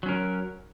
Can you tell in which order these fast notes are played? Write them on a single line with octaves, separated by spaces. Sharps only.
F#3 C#4 A#4